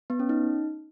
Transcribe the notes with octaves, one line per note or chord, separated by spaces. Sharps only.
B3
C#4
D#4